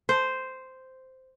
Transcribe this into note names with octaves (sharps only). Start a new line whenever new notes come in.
C5